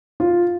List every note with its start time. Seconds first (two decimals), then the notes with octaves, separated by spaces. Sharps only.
0.20 F4